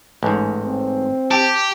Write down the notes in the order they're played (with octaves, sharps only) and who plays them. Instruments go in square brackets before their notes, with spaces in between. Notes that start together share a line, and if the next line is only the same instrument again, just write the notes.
[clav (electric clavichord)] A1 G#2
[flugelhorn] C4
[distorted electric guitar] G4 [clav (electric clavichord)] A5